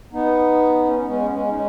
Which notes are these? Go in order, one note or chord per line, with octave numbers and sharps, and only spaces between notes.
B3 D#4
C#4
B3
G#3 C#4
B3
G#3 C#4
D#4
G#3 C#4